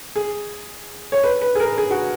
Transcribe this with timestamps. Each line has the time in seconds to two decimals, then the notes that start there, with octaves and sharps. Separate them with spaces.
0.16 G#4
1.12 C#5
1.23 B4
1.42 B4
1.55 G#4
1.60 A#4
1.78 G#4
1.91 F#4